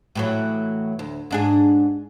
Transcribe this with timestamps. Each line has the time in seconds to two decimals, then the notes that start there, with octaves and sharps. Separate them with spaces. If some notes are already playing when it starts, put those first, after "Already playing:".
0.15 A2 E3 F#3
0.99 D2
1.31 G#2 D4 G#4